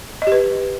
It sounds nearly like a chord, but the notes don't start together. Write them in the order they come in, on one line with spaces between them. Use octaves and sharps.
D#5 G4 B4